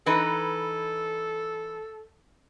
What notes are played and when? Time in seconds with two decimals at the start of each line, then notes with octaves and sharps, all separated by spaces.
0.06 E3 D#4 A4 B4